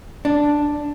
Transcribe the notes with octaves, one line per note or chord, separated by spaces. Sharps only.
D4